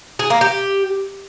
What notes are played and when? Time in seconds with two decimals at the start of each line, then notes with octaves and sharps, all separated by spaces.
0.19 G#4
0.30 A#3
0.41 G4